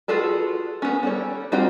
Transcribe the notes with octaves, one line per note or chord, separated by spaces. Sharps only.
F4 F#4 G#4 A4 B4
B3 C#4
G3 A4 C#5
G3 C4 F4 F#4 G5